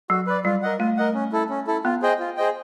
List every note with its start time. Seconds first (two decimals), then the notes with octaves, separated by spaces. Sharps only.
0.10 F#3 F#4
0.27 B4 D5
0.45 G3 F4
0.62 A#4 D#5 F#5
0.79 A3 F4
0.97 A#4 D#5 F#5
1.14 C#4
1.32 E4 A4
1.50 C#4
1.67 E4 A4
1.85 B3 F4
2.02 G#4 C5 D#5 G5
2.19 F4
2.37 G#4 C5 D#5 G5